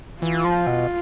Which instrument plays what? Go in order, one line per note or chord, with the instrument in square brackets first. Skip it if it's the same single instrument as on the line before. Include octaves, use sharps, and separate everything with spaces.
[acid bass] E3 [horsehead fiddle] F4
[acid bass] F3
B2